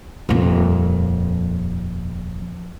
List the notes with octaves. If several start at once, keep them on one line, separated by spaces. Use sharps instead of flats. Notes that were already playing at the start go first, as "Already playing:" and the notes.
D#1 F2